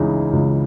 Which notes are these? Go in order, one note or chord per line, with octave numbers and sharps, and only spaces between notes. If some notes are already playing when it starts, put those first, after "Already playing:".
Already playing: C#2 C#3 E3 G#3 D#4
C#2